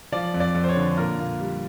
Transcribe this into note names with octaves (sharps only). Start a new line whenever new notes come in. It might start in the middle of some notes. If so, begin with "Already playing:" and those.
F3 D5
F2
D5
F2
C5
C#5
D3
A#2 A#4
A#2
G3